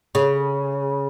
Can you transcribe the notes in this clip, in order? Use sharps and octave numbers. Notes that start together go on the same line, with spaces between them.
C#3